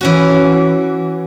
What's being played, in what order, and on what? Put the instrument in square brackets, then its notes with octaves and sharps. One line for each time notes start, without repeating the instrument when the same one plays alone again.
[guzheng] E3 C#4 F#4